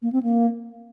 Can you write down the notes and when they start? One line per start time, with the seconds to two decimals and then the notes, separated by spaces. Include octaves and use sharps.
0.02 A#3
0.13 C4
0.23 A#3